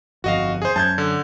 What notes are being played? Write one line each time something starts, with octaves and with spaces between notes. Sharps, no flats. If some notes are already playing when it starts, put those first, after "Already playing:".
G1 F2 F#4 D#5 F5
G#4 C5
F#2 A5 G6 G#6
D3